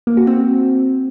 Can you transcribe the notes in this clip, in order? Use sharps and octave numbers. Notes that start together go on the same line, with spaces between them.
A#3
F#4
C4